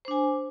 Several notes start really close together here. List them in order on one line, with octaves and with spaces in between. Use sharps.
C5 D4 G#5